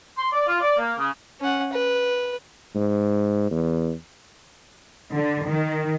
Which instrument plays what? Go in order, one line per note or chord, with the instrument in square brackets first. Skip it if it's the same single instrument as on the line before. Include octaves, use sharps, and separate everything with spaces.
[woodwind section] C6
D5
F4
D5
A#3
C#3
[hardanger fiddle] C#4 F#5
B4
[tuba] G#2
E2
[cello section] D3
D#3